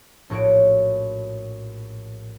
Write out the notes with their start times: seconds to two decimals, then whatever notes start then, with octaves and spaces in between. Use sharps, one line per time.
0.30 A#1 A2 F#4 C#5 D7